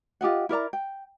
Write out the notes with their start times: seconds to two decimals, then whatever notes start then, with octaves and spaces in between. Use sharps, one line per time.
0.21 F4 G4 D#5 F#5
0.49 E4 A#4 D5 A#5
0.73 G5